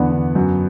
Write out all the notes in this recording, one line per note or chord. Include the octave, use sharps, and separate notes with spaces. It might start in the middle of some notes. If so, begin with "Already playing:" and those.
Already playing: E2 D3 E3 B3
D3
F#2